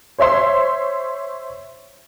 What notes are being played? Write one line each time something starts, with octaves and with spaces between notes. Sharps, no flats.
C5 C#5 E5 C6